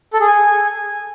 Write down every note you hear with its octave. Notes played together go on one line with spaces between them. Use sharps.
A4
G#4
G#5